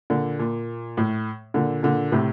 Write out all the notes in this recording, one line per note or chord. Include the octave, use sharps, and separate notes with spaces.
A#2 D3
A#2
A2
A#2 D3
A#2 D3
A2 C3